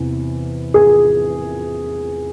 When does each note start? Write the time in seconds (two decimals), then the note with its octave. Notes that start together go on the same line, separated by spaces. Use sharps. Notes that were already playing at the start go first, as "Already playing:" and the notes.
Already playing: E2 C3
0.74 G#4